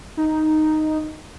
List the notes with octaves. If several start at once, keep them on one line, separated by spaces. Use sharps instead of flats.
D#4